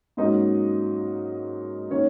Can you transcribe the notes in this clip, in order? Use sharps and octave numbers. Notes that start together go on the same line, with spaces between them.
G#2 F#3 A#3 C#4 D#4 D#5
D#3 A#3 C#4 C#5